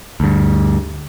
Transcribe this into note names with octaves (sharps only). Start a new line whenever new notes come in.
D2 G2